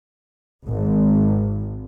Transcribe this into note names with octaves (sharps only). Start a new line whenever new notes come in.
G#1